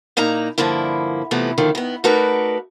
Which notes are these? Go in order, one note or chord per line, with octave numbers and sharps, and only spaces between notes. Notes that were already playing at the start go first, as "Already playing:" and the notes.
A#2 A#3 D#4 E4 A#5
G2 D3 F3 A#3 E4
C3 E3 F3 A3 B3
D#2 D3 D#3 F3
D#3 B3
A3 D#4 F#4 A#4 B4 D5